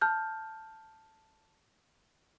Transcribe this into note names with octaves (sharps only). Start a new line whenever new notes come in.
A5 F6 G6